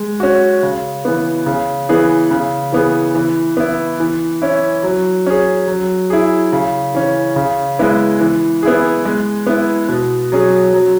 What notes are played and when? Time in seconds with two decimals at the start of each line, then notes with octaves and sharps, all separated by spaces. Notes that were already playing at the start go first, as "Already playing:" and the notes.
Already playing: G#3
0.20 C#4 F#4
0.63 C#3
1.05 E3 B3
1.46 C#3
1.89 E3 B3 G#4
2.31 C#3
2.73 E3 B3 G#4
3.15 E3
3.57 B3 E4
4.00 E3
4.42 C#4 E4
4.83 F#3
5.26 C#4 G#4
5.67 F#3
6.10 E4 G#4
6.53 C#3
6.94 E3 C#4
7.36 C#3
7.79 G#3 B3 E4
8.21 E3
8.63 B3 E4 G#4
9.05 G#3
9.47 B3 E4
9.89 B2
10.32 F#3 C#4 G#4
10.73 F#3